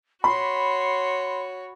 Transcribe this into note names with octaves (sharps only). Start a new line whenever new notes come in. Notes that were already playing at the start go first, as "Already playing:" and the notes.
F#4 C#5 B5 C6